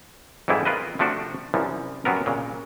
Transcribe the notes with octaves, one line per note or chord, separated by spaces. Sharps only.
F2 G#2 E3 G3 E4 G#4
F4 A#4 B4 D#5
C3 F3 A3 D4 F#4
C2 F#2 E3 F3
F#2 C3 B3 A#4
A#2 C#3 G#3